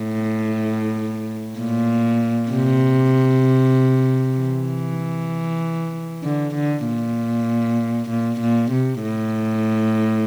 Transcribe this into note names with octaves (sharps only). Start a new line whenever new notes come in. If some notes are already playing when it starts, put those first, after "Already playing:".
Already playing: A2
A#2
C3
E3
D3
D3
A#2
A#2
A#2
C3
A2